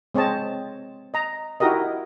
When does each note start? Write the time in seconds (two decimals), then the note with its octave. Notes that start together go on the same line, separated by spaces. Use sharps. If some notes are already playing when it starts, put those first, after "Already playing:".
0.15 G#3 C4 C#5 D#5 A5
1.14 D#5 A#5
1.60 D#4 E4 F#4 G4 A#4 D#5